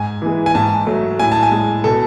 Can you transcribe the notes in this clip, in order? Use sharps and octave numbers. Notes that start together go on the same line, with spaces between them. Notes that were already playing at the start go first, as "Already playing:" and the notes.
Already playing: G#2 G#5
E3 G#3
G#5
G#2 A5
F#3 A3
A2 G#5
A5
G#5
G#3
B2 A4